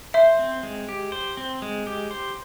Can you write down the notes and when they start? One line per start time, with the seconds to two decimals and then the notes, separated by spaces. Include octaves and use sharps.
0.14 C5 E5
0.39 C4
0.63 G#3
0.89 G4
1.12 C5
1.37 C4
1.62 G#3
1.87 G4
2.11 C5